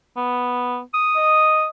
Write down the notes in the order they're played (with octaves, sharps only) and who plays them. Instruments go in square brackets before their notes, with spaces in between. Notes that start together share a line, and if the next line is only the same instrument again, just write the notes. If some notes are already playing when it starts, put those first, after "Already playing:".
[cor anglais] B3
[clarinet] D#6
[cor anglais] D#5